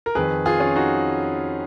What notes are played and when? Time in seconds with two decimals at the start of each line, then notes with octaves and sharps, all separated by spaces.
0.06 A#4
0.15 F2 D#3 G#4 B4
0.46 F4 G#4
0.60 C#4 F4
0.76 D#4 F#4